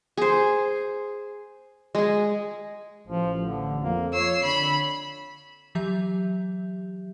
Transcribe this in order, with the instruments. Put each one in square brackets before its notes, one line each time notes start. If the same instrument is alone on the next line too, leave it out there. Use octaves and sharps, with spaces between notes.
[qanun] G#4 C5
G#3 G#4
[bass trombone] A1 [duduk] F3
[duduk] D3
[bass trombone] F2 [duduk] A#3
[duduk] C#5 [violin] E6 C7
[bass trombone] D3 [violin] B5
[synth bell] E3 F#3 G4 E5 G6